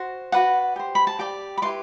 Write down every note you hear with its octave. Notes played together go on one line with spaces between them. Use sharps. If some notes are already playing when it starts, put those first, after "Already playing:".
Already playing: F#4 C5
F#4 B4 D5 F#5
G4 C5
B5
A5
G4 D5 G5
B5
E4 G4 B4 D5 C6